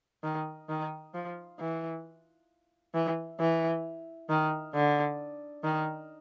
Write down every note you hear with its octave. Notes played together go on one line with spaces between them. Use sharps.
D#3
D#3
F3
E3
E3
E3
D#3
D3
D#3